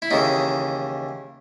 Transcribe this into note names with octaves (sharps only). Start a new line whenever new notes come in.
E4
D#2 C#3 E3 D#4